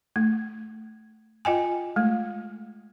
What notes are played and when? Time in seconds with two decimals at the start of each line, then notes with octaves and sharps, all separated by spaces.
0.16 A3
1.45 F4 D#5 G5 G#5
1.96 G#3 A3